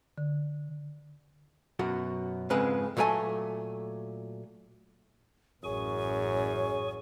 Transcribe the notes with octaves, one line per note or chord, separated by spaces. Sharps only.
D3
F#2 B2 F#4
F2 G#2 C#3 G#3 B4
A#2 F#3 A3 A#4 G#5 A5
A1 F#2 G#4 C#5 G#5 C#6